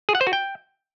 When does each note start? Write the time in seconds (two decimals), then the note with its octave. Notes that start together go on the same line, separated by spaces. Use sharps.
0.09 G#4
0.15 F#5
0.21 C5
0.27 F#4
0.33 G5